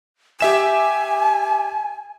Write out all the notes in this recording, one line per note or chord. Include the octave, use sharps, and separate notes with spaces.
G4 E5 G#5 E7